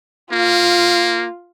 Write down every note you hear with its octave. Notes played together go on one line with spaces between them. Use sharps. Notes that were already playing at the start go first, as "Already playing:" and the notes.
A#3 F4